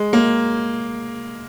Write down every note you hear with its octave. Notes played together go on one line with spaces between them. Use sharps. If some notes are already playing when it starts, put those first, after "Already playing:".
Already playing: G#3
A#3